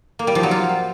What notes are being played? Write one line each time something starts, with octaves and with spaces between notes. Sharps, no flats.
A#3
G3
F3
F#3
F4